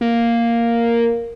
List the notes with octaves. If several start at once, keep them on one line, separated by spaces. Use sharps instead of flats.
A#3